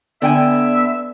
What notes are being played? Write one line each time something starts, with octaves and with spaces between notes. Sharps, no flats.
D3 B3 D5 E5 G5 G#5